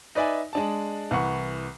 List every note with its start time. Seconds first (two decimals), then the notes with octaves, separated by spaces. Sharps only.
0.15 D#4 B4 D5 E5 G#5
0.53 G#3 D4 A5
1.11 C2 E3 F#5 C#6